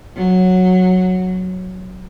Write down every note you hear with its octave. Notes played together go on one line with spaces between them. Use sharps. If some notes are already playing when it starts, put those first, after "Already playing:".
F#3